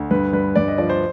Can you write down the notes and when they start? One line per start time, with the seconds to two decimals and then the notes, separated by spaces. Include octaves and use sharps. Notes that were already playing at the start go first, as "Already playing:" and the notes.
Already playing: D2
0.11 G2 B4
0.33 G2 B4
0.55 G2 D5
0.68 D#5
0.78 F3 D5
0.90 C5